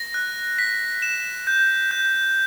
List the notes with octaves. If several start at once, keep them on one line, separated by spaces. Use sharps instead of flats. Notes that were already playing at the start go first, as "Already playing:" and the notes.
Already playing: A#6
F#6
B6
E7
G6
G6